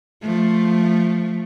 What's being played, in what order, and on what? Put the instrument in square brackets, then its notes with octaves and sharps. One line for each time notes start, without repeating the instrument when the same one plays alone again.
[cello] F3 A3